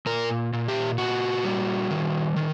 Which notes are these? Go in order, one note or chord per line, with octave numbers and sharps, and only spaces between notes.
A#2 A#4
A#2
G4
A#2 F#4
G3
D#3
D#3